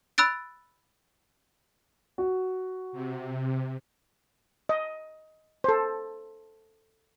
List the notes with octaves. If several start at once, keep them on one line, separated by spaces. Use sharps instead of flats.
B5 E6 F#6 A6 D7
F#4
C3
D#5
A4 C5